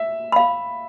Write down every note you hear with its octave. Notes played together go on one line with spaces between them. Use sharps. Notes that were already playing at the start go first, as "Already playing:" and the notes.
Already playing: E5
F5 B5